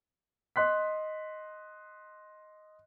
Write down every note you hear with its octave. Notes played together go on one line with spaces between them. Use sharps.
D#5 C6 F#6 B6